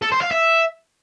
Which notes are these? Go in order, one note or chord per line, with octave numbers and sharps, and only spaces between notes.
A4
C5
F5
E5